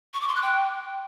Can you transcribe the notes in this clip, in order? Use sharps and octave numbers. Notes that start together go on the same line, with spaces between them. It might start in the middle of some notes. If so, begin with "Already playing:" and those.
C#6
D6
C6
F#6
G5